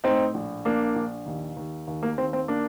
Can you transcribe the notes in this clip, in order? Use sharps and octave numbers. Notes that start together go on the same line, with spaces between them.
A2 C4 D#4
A#1
A#1 A#3 D4
A#1
D#2
D#2
D#2
A#3
D#2 C4
C4
A#3 D4